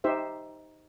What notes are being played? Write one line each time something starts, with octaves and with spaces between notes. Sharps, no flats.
D#4 G4 C5 E5